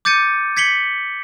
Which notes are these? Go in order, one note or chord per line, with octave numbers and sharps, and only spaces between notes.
D6 G6 A6 C#7 D#7
G#6 B6 C#7 F#7 G7